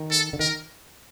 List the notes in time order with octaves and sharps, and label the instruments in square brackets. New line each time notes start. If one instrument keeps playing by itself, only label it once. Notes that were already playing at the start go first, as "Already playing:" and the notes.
Already playing: [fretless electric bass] D#3
[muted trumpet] A4
[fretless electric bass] D3
[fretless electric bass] D#3 [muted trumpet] A#4